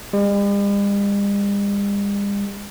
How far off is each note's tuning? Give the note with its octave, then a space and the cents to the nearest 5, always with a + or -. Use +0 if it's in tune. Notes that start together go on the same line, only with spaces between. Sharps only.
G3 +45